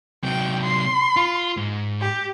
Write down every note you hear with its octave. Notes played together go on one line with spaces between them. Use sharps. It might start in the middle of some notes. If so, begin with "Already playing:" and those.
C3 F#3 G5
C6
F4
G#2
G4